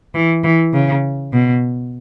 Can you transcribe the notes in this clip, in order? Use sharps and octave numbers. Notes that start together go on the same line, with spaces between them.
E3
E3
C#3
B2